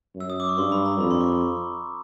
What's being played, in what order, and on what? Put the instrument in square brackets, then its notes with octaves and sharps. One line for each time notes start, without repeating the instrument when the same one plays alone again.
[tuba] F#2 [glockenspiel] E6
[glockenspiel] D#6
D6
C#6
[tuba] G2 [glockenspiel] C6
[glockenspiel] B5
A#5
[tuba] F2 [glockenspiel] B5
[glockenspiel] C6
C#6